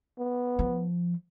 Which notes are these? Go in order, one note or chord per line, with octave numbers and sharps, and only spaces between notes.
B3
F3